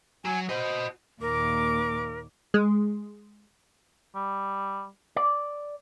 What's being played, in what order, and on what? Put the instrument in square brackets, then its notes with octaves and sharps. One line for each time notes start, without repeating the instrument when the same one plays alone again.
[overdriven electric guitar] F#3 [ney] G#5
[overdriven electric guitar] F#4 D#5 [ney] C5
[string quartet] D#2 A#2 D6 [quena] A#4
[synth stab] G#3
[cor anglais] G3
[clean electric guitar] D5